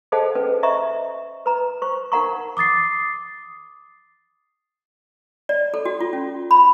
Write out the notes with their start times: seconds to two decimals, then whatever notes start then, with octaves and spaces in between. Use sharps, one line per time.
0.12 G#4 A4 C5 D#5 F#5 A5
0.35 C#4 B4
0.63 C5 D#5 E5 A#5 C#6
1.46 B4 A#5
1.82 C5 C#6
2.12 D#4 A#4 F#5 A#5 C#6
2.57 D6 D#6 A6 C7
5.49 D5
5.74 A4
5.85 F#4
6.01 F4
6.13 C#4
6.51 B5